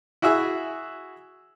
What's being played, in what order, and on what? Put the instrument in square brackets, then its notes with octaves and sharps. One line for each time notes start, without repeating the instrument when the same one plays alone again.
[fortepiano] E4 F#4 G#4 E5